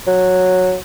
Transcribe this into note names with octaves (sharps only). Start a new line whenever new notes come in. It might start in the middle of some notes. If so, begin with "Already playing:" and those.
F#3